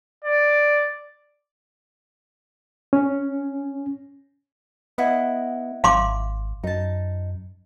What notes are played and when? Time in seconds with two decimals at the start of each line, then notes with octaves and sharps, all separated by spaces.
0.24 D5
2.93 C#4
4.98 B3 E4 D#5 F#5
5.84 G#1 F5 C6 D6
6.64 F#2 D#4 A5